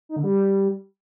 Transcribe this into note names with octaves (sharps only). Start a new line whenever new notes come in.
D#4
D3
G3